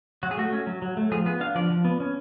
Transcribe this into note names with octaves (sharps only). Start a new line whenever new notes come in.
F#3 F#4
G#4
A3 F#4
C#4
F#3
F#3
A3
F3 G#4
B3 G#4
D4 F5
F3 D5
F3
B3
C#4